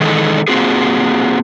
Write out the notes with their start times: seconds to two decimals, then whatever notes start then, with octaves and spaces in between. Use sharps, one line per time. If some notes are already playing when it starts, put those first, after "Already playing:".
0.01 D#3 E3 G#3 D#4 A4
0.48 A#3 C4 F4 F#4 G#4